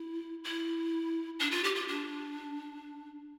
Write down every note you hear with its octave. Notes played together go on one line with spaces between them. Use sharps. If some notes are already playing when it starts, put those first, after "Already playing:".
Already playing: E4
E4
D4
F4
G4
F4
D4